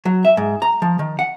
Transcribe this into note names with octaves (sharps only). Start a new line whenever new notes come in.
F#3
E5
G#2
A#5
F3
D#3
F#5